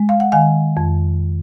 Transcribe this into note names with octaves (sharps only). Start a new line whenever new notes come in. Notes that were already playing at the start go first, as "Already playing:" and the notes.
Already playing: G#3
F5
F#5
D#3 F5 G#5
F2